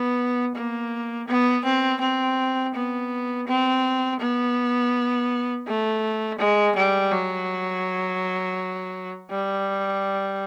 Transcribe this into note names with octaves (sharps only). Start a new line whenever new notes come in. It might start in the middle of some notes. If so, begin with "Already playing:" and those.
Already playing: B3
A#3
B3
C4
C4
B3
C4
B3
A3
G#3
G3
F#3
G3